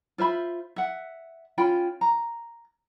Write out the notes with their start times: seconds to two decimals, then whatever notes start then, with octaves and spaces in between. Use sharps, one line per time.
0.18 F4 C5 E5 B5
0.76 E5 F#5
1.58 C#4 F4 G5 B5
2.01 A#5